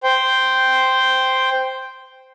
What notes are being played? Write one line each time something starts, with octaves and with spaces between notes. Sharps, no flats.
C5 G5